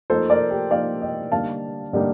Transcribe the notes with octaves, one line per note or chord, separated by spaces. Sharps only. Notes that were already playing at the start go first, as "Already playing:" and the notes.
F3 A#3 D#4 A4 C5
A#4 D5
G4
F3 A#3 D#4 D5 F5
D#5 G5
D3 G3 A#3 D#4 F5 A5
D3 G3 A#3 D#4